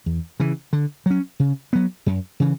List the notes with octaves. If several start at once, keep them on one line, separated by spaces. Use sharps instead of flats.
E2
C#3 E3
D3
F#3 C#4
C#3
F#3 B3
F#2
C#3 E3